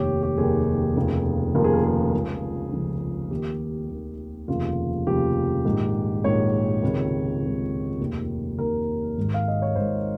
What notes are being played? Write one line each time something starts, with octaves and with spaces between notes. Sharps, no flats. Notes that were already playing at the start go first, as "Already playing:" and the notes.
Already playing: F1 D#2 D#3 G4 C#5
G4
F1 D#2 D#3 G#4
F1 D#2 C#3 F3
F1 D#2 C#3 F3 A#4
G#4
A#4
G#4
C#2 C#3 F3
C#2 C#3 F3
D#2 D#3 G4
D#2 D#3
F1 D#2 C#3 F3 F4
F1 D#2 C#3 F3 G4
A#1 G#2 D#3
A#1 G#2 D#3 C#5
C#2 C3 D#3
C#2 C3 D#3
F1 D#2 D#3
F1 D#2 D#3 A#4
G#1 G#2 D#3
F5
D#5
C#5
G#1 G#2 D#3 C5